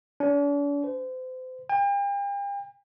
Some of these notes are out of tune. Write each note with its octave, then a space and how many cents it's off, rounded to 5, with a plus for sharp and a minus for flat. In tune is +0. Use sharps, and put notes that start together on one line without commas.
D4 -45
C5 -35
G5 +40